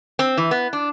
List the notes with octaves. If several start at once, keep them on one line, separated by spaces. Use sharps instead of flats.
C4
E3
B3
D4